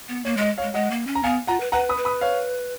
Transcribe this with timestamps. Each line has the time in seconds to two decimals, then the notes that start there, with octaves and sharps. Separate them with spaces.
0.09 B3
0.25 A#3 C#5
0.37 G#3 D#5
0.58 C#5 F5
0.62 G#3
0.74 G#3 D#5 F#5
0.91 A#3
1.07 C#4
1.15 A#5
1.23 B3 F5 G#5
1.47 F4 F#5 A#5
1.60 B4
1.72 B4 F#5 A#5
1.89 B5 D#6
1.97 B4
2.05 B5 D#6
2.21 C#5 F5